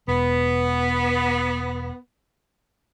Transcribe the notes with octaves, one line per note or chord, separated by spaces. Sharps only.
E1 B3